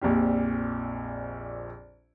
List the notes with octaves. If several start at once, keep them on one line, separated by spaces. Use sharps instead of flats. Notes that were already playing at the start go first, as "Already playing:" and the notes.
A#1 F2 A#2 G4